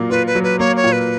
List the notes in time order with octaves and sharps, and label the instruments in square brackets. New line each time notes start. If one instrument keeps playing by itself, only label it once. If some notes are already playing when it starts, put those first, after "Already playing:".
Already playing: [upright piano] A#2 F#3 A#3
[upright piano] F4 [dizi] B4
[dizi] B4
[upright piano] F#3
[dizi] B4
[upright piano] A#3 [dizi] C#5
[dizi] C#5
[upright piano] A#2
[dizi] B4